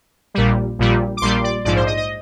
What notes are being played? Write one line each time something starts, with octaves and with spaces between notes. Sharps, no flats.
A#1 A#2 G3
A#1 A#2 G3
D6
A#1 A#2 G3 C6
D5
A#1 G#2 F3 D5
C5
D#5
D#5